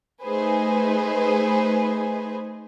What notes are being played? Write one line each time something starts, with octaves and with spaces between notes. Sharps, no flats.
A3 D#4 G#4 B4 C5 G#5